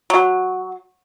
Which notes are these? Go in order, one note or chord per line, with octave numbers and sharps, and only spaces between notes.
F#3